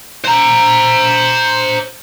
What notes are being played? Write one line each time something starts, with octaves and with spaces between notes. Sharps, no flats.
C5 A#5